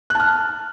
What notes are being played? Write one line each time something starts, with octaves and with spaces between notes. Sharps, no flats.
A5 F6 F#6